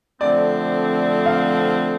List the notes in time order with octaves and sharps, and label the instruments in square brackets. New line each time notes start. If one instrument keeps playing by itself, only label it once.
[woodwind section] F2 D3 F3 A3 C4 [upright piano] D5
[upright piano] F5